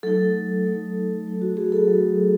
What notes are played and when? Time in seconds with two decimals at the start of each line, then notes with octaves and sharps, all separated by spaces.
0.03 F#3 A3 D#4 A4
0.65 F#3 A3 D#4
1.26 F#3 A3 D#4
1.42 F#4
1.57 G#4
1.72 A4
1.88 F#3 A3 D#4